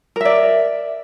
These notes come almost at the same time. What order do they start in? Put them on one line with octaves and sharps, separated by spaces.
A#4 E5 D5